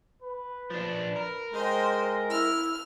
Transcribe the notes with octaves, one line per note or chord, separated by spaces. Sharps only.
B4
F3 D4
A#4
G#3 C5 D#5 G5
E4 F6